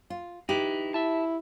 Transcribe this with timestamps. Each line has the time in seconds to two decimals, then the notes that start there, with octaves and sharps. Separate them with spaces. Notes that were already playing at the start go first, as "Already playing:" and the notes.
0.10 F4
0.49 D#4 E4 G4 B4
0.94 E4 E5 A5